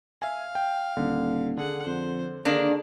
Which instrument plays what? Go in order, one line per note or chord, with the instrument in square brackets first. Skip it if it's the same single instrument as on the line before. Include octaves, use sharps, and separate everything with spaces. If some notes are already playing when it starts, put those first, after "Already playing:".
[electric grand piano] E5 G#5 [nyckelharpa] F5
[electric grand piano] G5
[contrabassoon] D#1 [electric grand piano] D3
[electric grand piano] D3 [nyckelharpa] G#4 F#5
[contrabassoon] F2 [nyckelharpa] C5
[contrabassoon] D3 [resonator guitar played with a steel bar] D#3 A#3 D4 [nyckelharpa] G#4